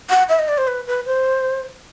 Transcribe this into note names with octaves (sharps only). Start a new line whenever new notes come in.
F#5
E5
D#5
D5
C5
B4
B4
C5